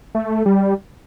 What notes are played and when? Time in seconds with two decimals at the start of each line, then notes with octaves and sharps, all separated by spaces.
0.15 A3
0.46 G3